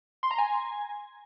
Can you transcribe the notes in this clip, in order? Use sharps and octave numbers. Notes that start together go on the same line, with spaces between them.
C6
A#5
G#5